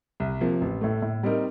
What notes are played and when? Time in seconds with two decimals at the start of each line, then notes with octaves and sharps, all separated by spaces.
0.20 C2
0.41 C3 F3 A#3
0.61 A1
0.81 A2 A3
1.02 A2
1.23 G3 C4 D#4 A#4